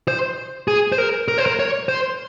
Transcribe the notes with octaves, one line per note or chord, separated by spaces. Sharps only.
C5
G#4
C5
A#4
A#4
C5
A#4
C#5
C5